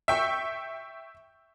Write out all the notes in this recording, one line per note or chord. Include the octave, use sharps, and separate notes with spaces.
E5 G5 C#6